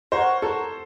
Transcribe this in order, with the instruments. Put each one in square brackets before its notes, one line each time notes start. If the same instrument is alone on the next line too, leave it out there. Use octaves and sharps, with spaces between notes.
[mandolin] F#4 A#4 C#5 F#5 [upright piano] C5
[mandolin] F#4 A#4 C#5 F#5 [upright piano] A4